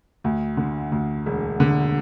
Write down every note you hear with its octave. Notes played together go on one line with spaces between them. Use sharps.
D2
D3
D2
E1
D3